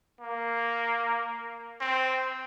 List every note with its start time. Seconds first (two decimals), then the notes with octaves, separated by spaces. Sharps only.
0.20 A#3
1.80 C4